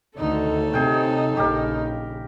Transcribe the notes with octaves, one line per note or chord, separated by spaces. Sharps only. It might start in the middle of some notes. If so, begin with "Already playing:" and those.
D2 D3 D#3 D#4 A4 C#5
C3 G#4 G5
A#1 C#3 G4 A#4